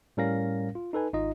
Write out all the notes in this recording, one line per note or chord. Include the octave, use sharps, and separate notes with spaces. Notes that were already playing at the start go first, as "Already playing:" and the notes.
A2 G3 C#4 A#4 F5 A#6
F4
D#4 A4 B4 G#5
G#1 D#4 F4 D#5